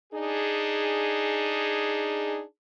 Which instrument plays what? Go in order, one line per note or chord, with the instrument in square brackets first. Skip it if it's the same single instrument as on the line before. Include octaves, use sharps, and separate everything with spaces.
[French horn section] D4 D#4 G#4